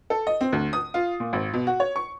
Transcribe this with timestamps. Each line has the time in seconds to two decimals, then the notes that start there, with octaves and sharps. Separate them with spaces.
0.10 A4
0.27 D#5
0.41 C4
0.52 D2
0.73 D#6
0.94 F4
1.20 A#2
1.33 G#1
1.54 B2
1.67 F#4
1.80 C#5
1.96 C#6